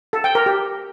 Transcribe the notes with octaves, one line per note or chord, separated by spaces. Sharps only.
A4
G5
A#4
G4